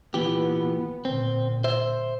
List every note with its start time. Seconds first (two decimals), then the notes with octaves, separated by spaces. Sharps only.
0.14 A#2 E3 B3 G4
1.05 A#2 D3 C4
1.64 C5 E5